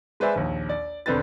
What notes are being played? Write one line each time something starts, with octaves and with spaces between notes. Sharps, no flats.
G#3 B4 C5 D5 E5 G#5
A#1 D#2
D5
E1 D3 C4 B4 A6